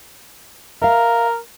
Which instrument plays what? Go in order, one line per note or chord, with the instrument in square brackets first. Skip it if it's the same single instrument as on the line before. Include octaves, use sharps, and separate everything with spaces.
[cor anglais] A#4 [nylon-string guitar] E5 F5